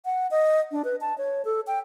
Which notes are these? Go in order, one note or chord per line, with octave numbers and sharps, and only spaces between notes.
F#5
D#5
D4
B4
A5
C#5
A4
G5